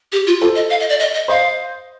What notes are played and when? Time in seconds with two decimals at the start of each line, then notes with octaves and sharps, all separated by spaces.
0.12 G4
0.27 F4
0.41 F4 A4 C5
0.55 D#5
0.70 F5
0.80 D#5
0.89 D5
1.00 D#5
1.14 D#5
1.28 C5 D#5 F5